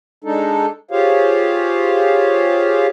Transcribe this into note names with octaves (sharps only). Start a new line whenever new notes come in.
G#3 D4 D#4 A4
F4 G4 G#4 C5 C#5 F5